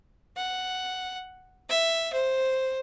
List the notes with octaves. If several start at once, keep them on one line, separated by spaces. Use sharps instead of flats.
F#5
E5
C5